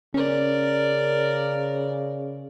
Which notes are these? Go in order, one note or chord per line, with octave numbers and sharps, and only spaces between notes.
C#3 C#4 A#4 D5